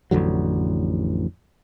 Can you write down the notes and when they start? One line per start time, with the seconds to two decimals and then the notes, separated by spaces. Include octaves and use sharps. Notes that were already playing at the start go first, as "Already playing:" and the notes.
0.11 A1 F2 D3 F#3